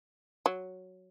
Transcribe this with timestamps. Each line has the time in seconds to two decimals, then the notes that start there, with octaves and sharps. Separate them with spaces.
0.46 F#3